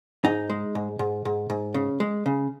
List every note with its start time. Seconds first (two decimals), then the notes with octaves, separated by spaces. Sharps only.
0.25 G#2 D#4
0.50 G#3
0.75 G#2
0.99 G#2
1.25 G#2
1.50 G#2
1.74 C#3
2.00 G#3
2.26 C#3